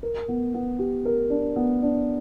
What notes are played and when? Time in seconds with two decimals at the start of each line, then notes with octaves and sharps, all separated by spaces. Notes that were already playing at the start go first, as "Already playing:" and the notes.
0.03 A#4
0.28 B3
0.54 B3
0.79 G4
1.05 A#4
1.30 D4
1.56 B3
1.82 D4